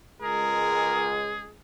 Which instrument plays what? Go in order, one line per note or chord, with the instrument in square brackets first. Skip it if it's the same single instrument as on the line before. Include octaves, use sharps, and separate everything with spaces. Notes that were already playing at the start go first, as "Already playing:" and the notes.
[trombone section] C#2 G#3 [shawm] G#4 [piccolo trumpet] A#4